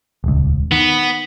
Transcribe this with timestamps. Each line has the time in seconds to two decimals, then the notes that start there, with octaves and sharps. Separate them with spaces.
0.24 D#1 C#2
0.72 D#3 B3